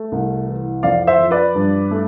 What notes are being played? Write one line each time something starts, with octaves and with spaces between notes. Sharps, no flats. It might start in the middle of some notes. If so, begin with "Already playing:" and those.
Already playing: A3
C2
E3
F2 D5 F5
C5 E5
F3
B4 D5
G2
A3